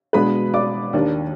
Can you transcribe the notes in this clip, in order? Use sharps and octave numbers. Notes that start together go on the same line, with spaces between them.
B2 G#3 B3 D4 B4 B5
D5 D6
D#2 D#3 A#3 D4